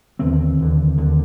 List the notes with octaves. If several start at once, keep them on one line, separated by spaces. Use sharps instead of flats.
D#2 D3 C4
D#2 D3
D#2 D3